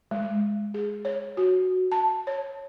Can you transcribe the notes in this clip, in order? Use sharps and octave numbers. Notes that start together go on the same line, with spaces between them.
G#3
G#4
C#5
F#4
A5
C#5